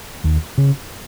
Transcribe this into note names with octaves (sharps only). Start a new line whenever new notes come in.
D#2
C#3